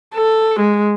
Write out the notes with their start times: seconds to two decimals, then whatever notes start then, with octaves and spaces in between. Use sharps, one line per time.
0.15 A4
0.60 G#3